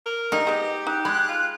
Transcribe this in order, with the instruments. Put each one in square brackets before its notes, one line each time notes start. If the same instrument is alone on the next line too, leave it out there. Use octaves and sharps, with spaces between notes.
[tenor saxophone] A#4
[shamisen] A3 A#3 G4 [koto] D#4 [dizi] D#5
[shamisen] G#3 B3 [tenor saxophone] G4
[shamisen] D#4 [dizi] F#6
[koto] G#3 [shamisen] B5 [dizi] F#6
[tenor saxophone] F4